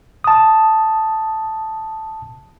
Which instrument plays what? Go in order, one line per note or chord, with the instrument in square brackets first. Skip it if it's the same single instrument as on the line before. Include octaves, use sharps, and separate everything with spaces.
[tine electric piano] A5 D#6